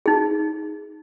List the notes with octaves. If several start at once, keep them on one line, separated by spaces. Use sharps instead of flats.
D#4 G#4